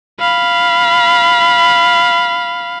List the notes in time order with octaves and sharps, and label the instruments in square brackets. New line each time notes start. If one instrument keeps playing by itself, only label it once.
[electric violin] F5 B5